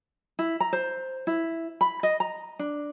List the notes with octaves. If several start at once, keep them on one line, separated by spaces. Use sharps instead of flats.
E4
A#5
C5
E4
B5
D#5
A#5
D4